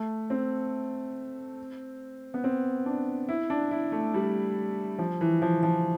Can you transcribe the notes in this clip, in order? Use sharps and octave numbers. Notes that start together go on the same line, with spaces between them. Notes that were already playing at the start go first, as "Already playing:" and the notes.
Already playing: A3
C4
B3
C4
D4
E4
D4
E4
A3
G3
F3
E3
F3
F3